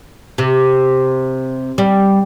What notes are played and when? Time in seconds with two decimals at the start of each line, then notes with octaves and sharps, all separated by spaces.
0.38 C3
1.78 G3